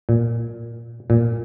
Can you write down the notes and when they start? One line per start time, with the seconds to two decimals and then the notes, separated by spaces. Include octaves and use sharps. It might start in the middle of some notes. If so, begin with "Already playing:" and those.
0.09 A#2
1.10 A#2